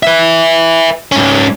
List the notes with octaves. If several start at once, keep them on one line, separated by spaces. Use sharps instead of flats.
B4 E5
G#2 C#4